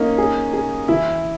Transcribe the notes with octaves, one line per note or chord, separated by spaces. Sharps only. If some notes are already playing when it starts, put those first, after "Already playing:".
Already playing: A#3 C#4 D#4
G#4
G#4
E3 E4